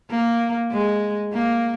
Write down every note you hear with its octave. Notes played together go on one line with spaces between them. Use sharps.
A#3
G#3
A#3